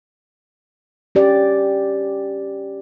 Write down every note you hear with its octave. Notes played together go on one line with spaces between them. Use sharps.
C#4 G4 D5